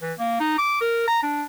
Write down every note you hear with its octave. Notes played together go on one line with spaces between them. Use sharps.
E3
A#3
D#4
D6
A#4
A#5
D4